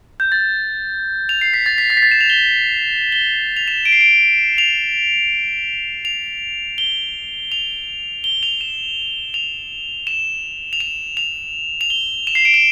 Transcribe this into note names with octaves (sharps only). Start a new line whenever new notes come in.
G6
A6
F7
C7
B6
A6
B6
A6
B6
A6
E7
F7
G7
G7
F7
E7
D7
C7
D7
F7
F7
G7
F7
G7
F7
E7
F7
E7
F7
E7
F7
F7
G7
E7
C7
D7
E7